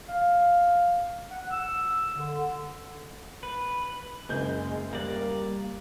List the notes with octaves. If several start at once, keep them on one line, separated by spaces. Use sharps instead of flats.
F5
F#5
E6
D3
B4
F#1 G#3 G6
G3 A#3 D5 F#6